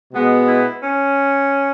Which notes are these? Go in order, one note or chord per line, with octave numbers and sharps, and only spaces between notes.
B2 G#3 B3
E4
C#4